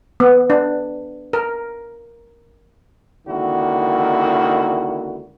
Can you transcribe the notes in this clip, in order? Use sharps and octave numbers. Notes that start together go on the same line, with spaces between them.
B3
D4
A#4
C#2 D3 D#3 A#3 E4 F#4